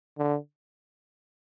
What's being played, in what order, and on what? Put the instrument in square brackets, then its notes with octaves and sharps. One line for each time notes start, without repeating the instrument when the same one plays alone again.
[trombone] D3